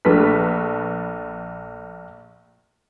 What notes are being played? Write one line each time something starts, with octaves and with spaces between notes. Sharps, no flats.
A#1 A3 D4 B4 B6